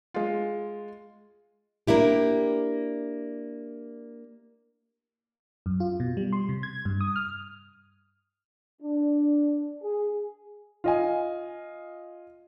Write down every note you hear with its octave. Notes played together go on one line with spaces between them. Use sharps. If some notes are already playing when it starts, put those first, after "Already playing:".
G#3 F4
A#3 D4 E4 G4
F#2
F4
B2
G3
C6
C3
G#6
G2
D#6
F6
D4
G#4
F4 D#5 G#5